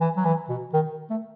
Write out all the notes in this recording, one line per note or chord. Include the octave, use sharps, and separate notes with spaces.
E3
F#3
E3
B2
D#3
A3